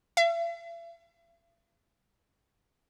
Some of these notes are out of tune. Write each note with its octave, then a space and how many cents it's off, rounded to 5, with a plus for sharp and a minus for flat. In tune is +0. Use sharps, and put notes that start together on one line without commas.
E5 +45